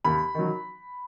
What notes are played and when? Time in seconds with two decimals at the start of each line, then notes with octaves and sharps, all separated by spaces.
0.04 D#2 B5
0.35 D#3 F#3